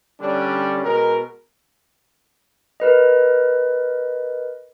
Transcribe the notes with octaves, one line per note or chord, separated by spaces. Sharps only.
D3 G3 C#4 D4
B2 G#3 A#4
A#4 B4 D#5